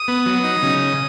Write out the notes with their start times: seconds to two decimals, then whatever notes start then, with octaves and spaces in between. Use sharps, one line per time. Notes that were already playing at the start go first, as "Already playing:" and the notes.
Already playing: D#6
0.08 B3
0.26 F#3
0.44 D#4
0.63 C#3